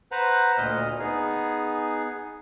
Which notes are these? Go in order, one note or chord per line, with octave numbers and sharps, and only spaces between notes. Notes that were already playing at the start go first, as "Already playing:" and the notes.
B4 C5 F#5 A#5
D2 A#2 D#5 F6
B3 D#4 G#4